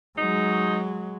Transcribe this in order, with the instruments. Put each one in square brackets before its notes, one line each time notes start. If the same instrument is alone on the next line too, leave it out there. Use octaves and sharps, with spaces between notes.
[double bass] F#3 G#3 [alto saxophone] D#4